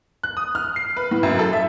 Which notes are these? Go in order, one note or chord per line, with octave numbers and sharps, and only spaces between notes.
F#6
D#6
F6
C7
B4
A2
F#2
A4
E5